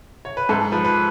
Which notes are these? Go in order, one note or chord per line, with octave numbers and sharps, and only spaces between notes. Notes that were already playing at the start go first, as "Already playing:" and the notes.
C#5
B4
G#2 A4
F3 B4
B4